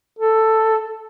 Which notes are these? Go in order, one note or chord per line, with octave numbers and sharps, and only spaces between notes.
A4